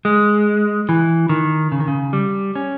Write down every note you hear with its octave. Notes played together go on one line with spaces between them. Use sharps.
G#3
E3
D#3
C#3
D#3
C#3
G3
C#4